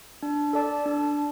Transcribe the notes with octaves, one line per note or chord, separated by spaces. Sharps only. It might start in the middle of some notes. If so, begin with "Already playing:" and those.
D4
A4 D5 A5
D4